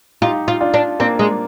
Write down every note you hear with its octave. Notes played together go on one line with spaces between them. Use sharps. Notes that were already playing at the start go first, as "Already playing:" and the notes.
D#4 F4 G4
F4
D4 F4
D4
A#3 C4 D4
G#3